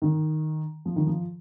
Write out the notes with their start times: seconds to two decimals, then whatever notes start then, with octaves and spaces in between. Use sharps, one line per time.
0.02 D#3
0.86 F3
0.96 D#3
1.07 F3